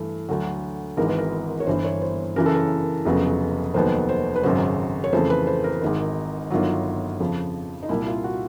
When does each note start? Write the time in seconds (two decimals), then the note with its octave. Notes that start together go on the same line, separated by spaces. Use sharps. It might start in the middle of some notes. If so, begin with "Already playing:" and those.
Already playing: G2 E3 A3
0.29 D2 D3 F#3
0.97 G#1 G#2 E3 A#4
1.09 B4
1.19 A#4
1.60 C#5
1.67 G1 G2 E3 C5
1.84 C#5
2.02 C5
2.36 F#2 C#3 E3 A#4
2.46 A4
2.54 A#4
3.05 F1 F2 C#3 F#3 B3
3.74 F1 D#2 D#3 F#3 B3 C5
4.09 C5
4.36 B4
4.43 G#1 F#2 C#3 F#3 C5
5.04 C#5
5.13 F2 C#3 E3 A3 C5
5.30 B4
5.47 C5
5.64 A#4
5.82 G#1 G#2 D#3
6.50 G1 G2 D#3 F#3 F4
7.20 F2 C#3 F3
7.83 D#4
7.89 C2 A#2 G3 E4
8.06 F4
8.24 F#4